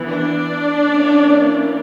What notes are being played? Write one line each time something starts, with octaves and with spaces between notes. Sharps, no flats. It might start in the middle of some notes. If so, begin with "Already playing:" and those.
Already playing: E3 B3
D4 D5
E3 A#3 C#4